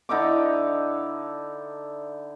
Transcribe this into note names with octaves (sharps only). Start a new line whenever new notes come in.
D3 D#4 E4 D6